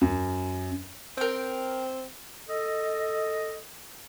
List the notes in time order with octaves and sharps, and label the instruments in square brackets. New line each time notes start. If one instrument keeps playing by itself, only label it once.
[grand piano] F#2
[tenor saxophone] C4 [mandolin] A#4 G5
[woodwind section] A4 D#5